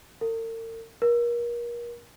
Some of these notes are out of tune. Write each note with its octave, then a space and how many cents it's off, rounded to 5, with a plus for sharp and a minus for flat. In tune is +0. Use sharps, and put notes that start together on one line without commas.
A#4 -45
A#4 +35